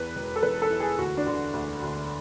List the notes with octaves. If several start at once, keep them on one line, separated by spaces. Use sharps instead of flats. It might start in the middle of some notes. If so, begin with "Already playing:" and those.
Already playing: E2 B4
E1
A4
E2 B4
A4
E3
G#4
D2 F#4
D4
D3
D2
D2